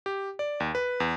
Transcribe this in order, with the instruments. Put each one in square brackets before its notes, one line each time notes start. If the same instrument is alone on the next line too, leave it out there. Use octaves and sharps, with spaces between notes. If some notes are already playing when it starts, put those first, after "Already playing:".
[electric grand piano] G4
D5
D#2
B4
E2